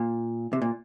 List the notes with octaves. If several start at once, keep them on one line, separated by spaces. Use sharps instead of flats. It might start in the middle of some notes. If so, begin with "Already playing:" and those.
Already playing: A#2
C3
A#2